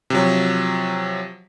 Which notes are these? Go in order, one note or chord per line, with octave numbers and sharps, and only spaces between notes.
C3 F3 F#3